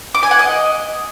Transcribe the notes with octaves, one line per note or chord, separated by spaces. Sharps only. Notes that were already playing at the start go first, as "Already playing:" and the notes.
D6
G#5
F#5
D#5